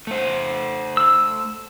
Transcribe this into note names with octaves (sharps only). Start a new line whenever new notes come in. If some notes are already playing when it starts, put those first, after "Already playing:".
A3 C5
E6